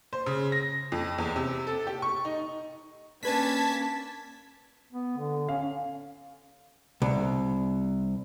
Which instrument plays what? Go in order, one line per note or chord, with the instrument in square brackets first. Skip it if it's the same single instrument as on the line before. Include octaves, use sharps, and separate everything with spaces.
[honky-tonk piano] C5
C#3
A#6
F2
E2
C3
A4
G4
C#6
D#4
[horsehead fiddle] A#3 C#4 [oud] D4 B4 [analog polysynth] A5 G#6 B6
[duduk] B3
D3
[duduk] C#4 [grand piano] F5
[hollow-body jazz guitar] C2